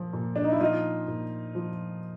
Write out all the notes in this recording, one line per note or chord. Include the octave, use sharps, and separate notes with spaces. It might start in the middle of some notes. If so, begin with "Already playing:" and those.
Already playing: A#2 F3
A#2
D4
D#4
E4
F3 D#4 F4
A#2
F3